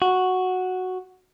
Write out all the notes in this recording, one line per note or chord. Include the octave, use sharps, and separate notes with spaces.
F#4